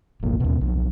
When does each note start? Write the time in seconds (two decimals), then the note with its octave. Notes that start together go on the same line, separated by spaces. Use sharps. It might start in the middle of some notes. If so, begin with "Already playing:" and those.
0.22 E1 A1 A#3
0.40 D#2 B2
0.61 B1 F3